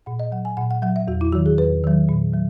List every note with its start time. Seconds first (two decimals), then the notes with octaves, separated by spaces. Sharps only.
0.06 A#2 F#5
0.20 D#5
0.32 F#3 F#5
0.45 G#5
0.57 A#2 F#5
0.71 F#5
0.82 F#3 F#5
0.96 E5
1.07 E2 F#4
1.21 E4
1.32 D#3 F#3 F#4
1.46 G#4
1.58 E2 B4
1.84 D#3 F#3
2.09 A#2
2.34 F#3